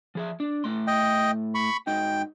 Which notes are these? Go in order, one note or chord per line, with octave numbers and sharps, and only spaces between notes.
F3 G#4 E5
D4
A2 A3 C6
D#5 G5
B5 C#6
G#2 D#4 F#4 G5